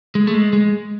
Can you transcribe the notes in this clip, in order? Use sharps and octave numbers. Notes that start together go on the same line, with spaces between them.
G#3
A3
G#3
G#3